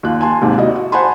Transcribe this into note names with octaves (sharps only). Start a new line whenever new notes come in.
D#2 F4 F#6
G#5 A5 C6
D#2 G#2 C3
E4 F#4 D5 D#5
F#4
C5 F#5 G#5 A5 B5 C6